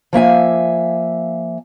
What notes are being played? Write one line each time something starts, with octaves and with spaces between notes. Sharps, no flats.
F3 A#3 E5 G#5